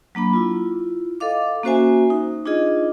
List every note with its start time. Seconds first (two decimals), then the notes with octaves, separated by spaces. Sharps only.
0.15 F#3 A#3 D4 B5
0.33 E4 F4
1.20 A4 D#5 F5 D6
1.64 A#3 C#4 F#4 C5 E5 G#5
2.10 D#4
2.46 D4 D#4 F4 G#4 D#5